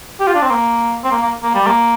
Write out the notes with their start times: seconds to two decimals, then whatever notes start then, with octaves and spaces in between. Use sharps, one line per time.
0.20 G4
0.27 F4
0.35 D4
0.42 C4
0.50 A#3
1.04 C4
1.11 A#3
1.22 A#3
1.43 A#3
1.55 G3
1.67 A#3